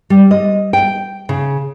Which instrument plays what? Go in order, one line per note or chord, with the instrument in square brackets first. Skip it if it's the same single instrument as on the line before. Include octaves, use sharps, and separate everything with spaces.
[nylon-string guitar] G3
D#5
G5
C#3